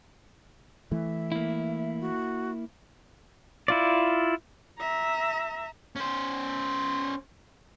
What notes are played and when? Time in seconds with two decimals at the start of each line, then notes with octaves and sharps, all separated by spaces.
0.91 E3 A3 E5
1.32 A#3 E4
2.01 F#4
3.68 E4 F4 D5
4.79 E5 A#5
5.96 C#4 C5